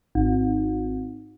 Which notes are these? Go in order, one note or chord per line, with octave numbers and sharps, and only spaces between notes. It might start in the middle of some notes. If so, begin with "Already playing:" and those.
G#1